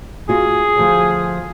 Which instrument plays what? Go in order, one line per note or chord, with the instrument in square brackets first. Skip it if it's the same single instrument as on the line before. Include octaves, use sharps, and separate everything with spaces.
[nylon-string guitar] F4 F#4 [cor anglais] G#4
[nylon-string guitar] D2 F3